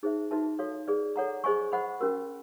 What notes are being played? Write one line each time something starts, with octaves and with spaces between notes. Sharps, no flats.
D#4 G#4 C5 E5
D#4 F#4 B4 E5 A5
F#4 A4 C#5 F5
G#4 B4 D5
A4 C#5 F#5 A#5
G#4 C5 D#5 G#5 C#6
C5 D#5 F#5 B5
C#4 F#4 A#4